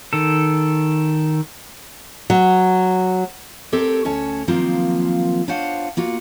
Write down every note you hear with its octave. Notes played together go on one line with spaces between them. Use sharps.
D#3 A4
F#3
C4 G4 A4 A#4 C#5 D5
D2 C#4 C#5 A5
D#3 F3 F#3 A#3 C4 F4
D4 F4 C5 C#5 F5 F#5
A#3 F4 F#4